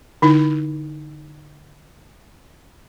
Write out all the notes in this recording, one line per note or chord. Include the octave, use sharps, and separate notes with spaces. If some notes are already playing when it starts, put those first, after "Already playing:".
D3 D#4 E4